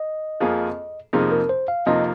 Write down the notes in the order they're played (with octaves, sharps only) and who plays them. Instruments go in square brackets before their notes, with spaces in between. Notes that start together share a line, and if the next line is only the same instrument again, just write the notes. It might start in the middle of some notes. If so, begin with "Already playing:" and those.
Already playing: [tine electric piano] D#5
[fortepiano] F2 F3 A#3 G#4
[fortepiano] F2 C3 F3 A#3 D#4 [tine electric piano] G#4
[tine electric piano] A#4
C5
F5
[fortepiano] F2 C3 F3 A#3 D#4 [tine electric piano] D#5